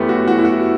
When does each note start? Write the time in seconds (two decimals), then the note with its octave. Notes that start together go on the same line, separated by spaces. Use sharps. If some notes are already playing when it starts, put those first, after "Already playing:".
Already playing: F#2 E3 A3 B3 G4
0.09 F#4
0.27 E3 F#4
0.39 E4
0.45 F#4